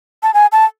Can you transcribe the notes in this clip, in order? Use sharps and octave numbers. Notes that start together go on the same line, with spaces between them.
A5
G#5
A5